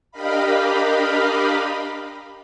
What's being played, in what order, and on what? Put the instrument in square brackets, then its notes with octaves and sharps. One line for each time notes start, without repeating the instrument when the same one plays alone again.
[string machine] D4 G4 A#4 D#5 F5 B5